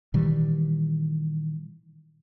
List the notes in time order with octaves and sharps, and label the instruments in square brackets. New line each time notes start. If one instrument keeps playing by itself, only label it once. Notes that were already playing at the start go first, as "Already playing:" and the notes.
[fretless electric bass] A#2 D#3 E3 G3